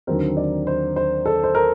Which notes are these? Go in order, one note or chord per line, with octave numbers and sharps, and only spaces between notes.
D#2 D3 F#3 C4 A#4
D5
C5
C5
A4
C5
A#4